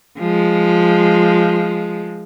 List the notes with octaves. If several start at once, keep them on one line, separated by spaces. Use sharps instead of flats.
F3 G#3